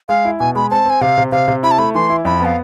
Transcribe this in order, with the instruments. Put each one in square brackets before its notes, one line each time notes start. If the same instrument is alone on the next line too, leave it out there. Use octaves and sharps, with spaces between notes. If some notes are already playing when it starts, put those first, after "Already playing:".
[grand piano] G#3 [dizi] F5
[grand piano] E4
[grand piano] B2 [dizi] G#5
[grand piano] G#3 [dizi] B5
[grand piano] C4 [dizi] A5
[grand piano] C4 [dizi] G#5
[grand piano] C3 [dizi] F5
[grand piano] C3
[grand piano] C3 [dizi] F5
[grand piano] C3
[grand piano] E4 [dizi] B5
[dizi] A5
[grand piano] A3 [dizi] B5
[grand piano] E3 [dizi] C6
[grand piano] E4
[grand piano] F2 [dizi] B5
[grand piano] B3 [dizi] F5